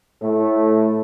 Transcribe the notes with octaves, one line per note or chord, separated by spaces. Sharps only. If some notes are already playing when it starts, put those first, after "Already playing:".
A2 A3